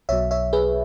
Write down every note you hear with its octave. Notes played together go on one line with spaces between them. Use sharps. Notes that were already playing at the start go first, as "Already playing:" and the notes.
B1 B2 F#3 C#5 E5
C#5 E5
G#4 B4